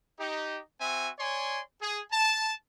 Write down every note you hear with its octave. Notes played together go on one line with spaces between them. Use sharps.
D#4 G4
C4 F#4 E5 G#5
C#5 D5 G#5 C6
G#4
A5